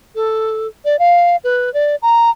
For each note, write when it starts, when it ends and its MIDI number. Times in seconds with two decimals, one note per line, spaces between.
0.15 0.67 69
0.85 0.96 74
0.99 1.36 77
1.44 1.72 71
1.74 1.96 74
2.02 2.30 82